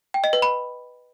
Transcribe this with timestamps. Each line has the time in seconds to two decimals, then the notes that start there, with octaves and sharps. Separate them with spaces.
0.14 G5
0.24 D#5
0.33 B4
0.42 B5